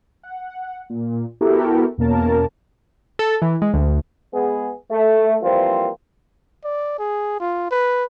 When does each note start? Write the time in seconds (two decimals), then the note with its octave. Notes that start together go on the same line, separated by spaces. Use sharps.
0.23 F#5
0.90 A#2
1.41 B3 E4 F#4 G4 A4 A#4
1.98 E2 B2 A#3 C#4 A#4 A5
3.19 A4
3.42 E3
3.62 G#3
3.74 D2
4.34 G#3 B3 G#4
4.91 A3
5.42 E3 F3 G3 A#3 C4 F4
6.64 D5
6.99 G#4
7.40 F4
7.71 B4